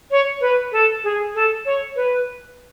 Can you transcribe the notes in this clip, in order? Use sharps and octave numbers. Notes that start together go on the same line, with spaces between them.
C#5
B4
A4
G#4
A4
C#5
B4